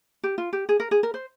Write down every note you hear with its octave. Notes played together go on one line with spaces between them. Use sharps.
G4
F4
G4
G#4
A#4
G#4
A#4
C5